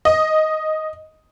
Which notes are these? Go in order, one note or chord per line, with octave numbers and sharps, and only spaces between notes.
D#5